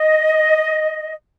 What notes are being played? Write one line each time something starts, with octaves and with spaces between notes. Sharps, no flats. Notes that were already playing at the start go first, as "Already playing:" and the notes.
Already playing: D#5